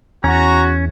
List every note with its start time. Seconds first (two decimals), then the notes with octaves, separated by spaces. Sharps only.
0.24 E2 C#4 F#4 A#5